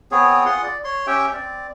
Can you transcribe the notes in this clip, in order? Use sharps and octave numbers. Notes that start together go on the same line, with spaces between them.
B3 C4 G#4 C#5
F4 G#4 F#5 C6
D5
C#5 C6
C#4 G4 E5 G5
C4 D5